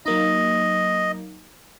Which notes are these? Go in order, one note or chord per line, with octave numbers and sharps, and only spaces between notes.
F#3 A#3 D#4 D#5